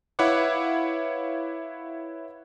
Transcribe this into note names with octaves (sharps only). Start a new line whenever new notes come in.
E4 B4 C#5 F5 F#5 D6